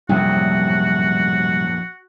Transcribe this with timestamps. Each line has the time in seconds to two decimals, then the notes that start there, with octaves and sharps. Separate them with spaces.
0.09 A#1 F#2 A2 C3 G3 F#4